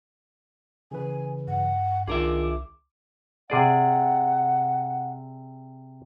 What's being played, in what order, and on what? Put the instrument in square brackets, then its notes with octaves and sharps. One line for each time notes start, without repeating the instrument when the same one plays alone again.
[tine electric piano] C#3 E3 B4 [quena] G#5
[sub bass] G2 [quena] F#5
[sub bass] C2 [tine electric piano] D#3 D4 F4 [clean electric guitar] G#4 A#4 E5 [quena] D6
[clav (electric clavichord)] C3 G#4 D5 [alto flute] F#5